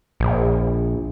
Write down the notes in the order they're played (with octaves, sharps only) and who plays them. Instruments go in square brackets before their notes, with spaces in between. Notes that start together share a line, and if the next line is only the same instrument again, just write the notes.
[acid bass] A#1